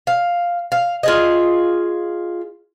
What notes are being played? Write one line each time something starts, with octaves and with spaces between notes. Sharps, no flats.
F5
F5
F4 G#4 D#5